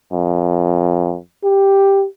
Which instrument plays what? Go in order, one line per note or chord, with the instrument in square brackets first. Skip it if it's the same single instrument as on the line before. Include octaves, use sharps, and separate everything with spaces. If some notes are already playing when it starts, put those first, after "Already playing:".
[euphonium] F2
G4